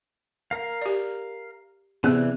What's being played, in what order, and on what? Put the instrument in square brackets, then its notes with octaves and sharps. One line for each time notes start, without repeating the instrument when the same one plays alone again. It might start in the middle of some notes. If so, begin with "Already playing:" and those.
[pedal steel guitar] A#4 F5
[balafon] G4 D5
[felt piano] C3 [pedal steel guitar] E3 D5 F#6 [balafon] B3 G#4